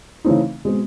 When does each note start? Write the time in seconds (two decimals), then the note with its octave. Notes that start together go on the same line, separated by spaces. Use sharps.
0.25 C#3 E3 A3 C4 D#4
0.65 B2 G#3 C4